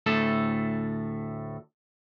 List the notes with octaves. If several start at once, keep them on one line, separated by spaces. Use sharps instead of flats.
D2 A2 A3 A4